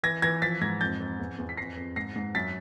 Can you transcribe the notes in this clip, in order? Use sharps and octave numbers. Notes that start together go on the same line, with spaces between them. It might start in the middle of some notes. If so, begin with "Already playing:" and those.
E3 G#6 A#6
E3 G#6 A#6
F3 A6 B6
G#2 G#6 A#6
F2 G6 A6
F2
E2
E2
B6
F2 A#6 C7
F2
G#2 A#6 C7
G#2
F#2 A6 B6